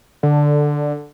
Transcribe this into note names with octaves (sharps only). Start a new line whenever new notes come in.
D3